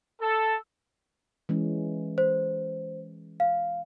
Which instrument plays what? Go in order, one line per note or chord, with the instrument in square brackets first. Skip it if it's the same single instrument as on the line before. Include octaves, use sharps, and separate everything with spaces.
[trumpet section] A4
[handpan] E3 G#3 C#4
[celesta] C5
F5